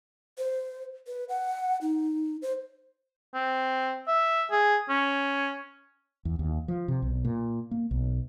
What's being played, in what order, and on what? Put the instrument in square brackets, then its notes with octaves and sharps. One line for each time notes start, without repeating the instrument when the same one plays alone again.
[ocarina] C5
B4
F#5
D#4
C5
[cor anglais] C4
E5
G#4
C#4
[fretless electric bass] E2
D#2
F3
C3
B1
A#2
A#3
B1